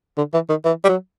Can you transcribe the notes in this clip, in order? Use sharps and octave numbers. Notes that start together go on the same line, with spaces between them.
D3
E3
D#3
E3
G3
F#3